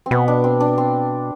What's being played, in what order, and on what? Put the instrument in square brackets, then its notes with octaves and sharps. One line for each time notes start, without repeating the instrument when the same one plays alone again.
[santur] C4
[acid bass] B2 [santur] B3
[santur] D4
C4
D4
C4